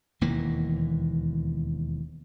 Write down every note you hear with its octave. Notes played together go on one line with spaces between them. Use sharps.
E1 D#2 E3 A#3